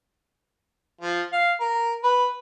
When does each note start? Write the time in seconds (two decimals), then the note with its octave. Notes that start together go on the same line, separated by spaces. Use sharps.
1.01 F3
1.33 F5
1.60 A#4
2.03 B4